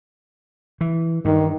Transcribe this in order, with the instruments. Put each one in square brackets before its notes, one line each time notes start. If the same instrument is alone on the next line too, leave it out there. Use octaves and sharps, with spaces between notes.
[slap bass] E3
[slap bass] G2 [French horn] D#3